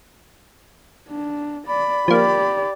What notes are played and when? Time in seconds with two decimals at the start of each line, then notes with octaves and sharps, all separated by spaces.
1.09 D4
1.67 D5 B5
2.08 F3 A#3 G4 D5